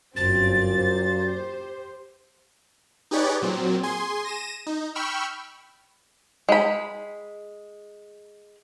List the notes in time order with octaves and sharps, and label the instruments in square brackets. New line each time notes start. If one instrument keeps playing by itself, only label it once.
[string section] G1 C4 [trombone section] F#2 A#2 [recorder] A6
[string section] G4 C5
[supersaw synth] D#4 G4 G#4 B4 C#5 D5
A#2 F#3 C4
G#4 G#5 C6
A#6 D#7 E7
D#4
G5 B5 C#6 E6 F6
[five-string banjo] G#3 B5